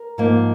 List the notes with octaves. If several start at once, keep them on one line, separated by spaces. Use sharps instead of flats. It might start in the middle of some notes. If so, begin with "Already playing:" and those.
Already playing: A#4
G#2 F3 A#3